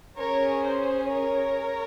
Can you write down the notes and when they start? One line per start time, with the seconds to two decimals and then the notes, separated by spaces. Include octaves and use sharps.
0.18 C#4 G#4 A#4 C#5
0.64 C5
1.09 A#4 C#5